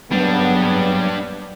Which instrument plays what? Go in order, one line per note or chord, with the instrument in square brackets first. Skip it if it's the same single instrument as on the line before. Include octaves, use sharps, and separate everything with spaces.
[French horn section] C#3 A#3 B3 [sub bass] F#3 [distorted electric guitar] G3 D4